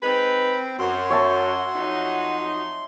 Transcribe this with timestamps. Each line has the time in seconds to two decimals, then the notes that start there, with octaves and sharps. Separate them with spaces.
0.03 G#3 C4 D#4 B4
0.79 F#2 F#4 C6
1.10 C#5 E5 A5
1.75 F2 F#3 D#4